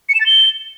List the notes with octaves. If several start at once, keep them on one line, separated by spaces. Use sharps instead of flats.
C#7
E7
A6
G7